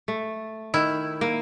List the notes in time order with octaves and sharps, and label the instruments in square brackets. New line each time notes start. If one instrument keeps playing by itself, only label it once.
[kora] A3
[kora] D#3 [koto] E4
[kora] A#3